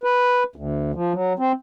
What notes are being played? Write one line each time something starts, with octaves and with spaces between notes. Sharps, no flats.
B4
D2
F3
F#3
C4